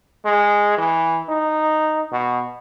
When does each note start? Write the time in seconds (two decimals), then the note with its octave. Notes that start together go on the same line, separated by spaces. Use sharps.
0.25 G#3
0.78 E3
1.29 D#4
2.12 B2